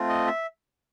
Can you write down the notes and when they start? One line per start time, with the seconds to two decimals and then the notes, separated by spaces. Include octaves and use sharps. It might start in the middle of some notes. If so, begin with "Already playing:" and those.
Already playing: A3 C4 F4
0.09 D#5
0.27 E5